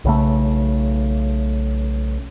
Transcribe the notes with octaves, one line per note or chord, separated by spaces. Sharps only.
B1 C#3 A3